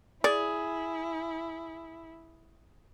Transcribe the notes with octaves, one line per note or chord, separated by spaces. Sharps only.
E4 G#4 D5